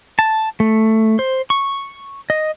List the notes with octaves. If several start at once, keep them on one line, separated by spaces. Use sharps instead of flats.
A5
A3
C5
C#6
D#5